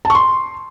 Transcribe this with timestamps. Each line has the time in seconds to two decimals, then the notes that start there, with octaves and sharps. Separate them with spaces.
0.05 A5
0.10 C#6
0.15 C6